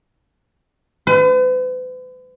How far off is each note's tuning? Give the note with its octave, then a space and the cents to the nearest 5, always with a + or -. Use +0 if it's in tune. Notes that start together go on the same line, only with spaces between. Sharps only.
B4 +45